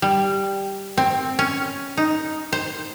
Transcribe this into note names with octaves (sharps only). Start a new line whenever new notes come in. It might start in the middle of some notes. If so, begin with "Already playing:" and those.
G3
C4
C#4
D#4
C5